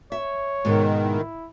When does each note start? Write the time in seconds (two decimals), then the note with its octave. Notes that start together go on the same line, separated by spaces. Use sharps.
0.12 C#5 E5
0.65 G#2 B2 D#3
1.03 E4